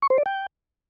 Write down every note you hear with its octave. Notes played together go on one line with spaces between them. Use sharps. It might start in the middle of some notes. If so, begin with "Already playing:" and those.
C#6
C5
D5
G5